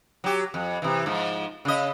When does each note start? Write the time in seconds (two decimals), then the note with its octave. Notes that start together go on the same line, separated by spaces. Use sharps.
0.24 F#3 G4
0.54 F2
0.82 C3 E3
1.06 G#2 F3
1.65 C#3 D#5